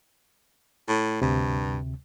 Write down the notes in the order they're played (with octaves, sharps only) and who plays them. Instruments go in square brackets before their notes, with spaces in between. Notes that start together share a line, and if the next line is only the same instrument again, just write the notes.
[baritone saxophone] A2
[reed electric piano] D2 C3 [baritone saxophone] G2